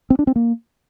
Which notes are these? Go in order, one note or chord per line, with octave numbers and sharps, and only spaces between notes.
C4
D4
C4
A#3